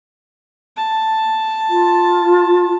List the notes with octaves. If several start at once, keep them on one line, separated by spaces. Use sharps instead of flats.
A5
F4